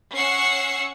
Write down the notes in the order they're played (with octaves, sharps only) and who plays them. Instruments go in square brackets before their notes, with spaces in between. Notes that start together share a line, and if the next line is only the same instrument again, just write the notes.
[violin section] C#4 F#5 C#6 E6 C7